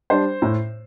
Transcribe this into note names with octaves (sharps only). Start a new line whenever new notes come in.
G3 D4 C5
A2